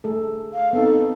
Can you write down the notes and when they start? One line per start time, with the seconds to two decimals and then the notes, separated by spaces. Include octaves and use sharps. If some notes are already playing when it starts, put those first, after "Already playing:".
0.04 A3 G#4 A4
0.53 F5
0.73 B3 C4 D#4 A4